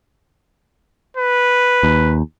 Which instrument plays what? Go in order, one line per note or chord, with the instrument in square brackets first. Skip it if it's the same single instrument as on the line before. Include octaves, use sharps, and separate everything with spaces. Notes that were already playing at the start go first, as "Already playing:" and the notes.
[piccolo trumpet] B4
[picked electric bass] D#2